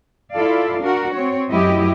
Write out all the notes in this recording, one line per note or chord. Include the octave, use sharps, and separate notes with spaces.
E4 F4 A4 D5 F5
D4 F#4 A#4
C4 C#5
F#2 F#3 A3 E4 G4 D#5